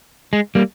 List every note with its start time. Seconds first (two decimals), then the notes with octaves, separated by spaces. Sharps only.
0.33 G#3
0.55 G3 A#3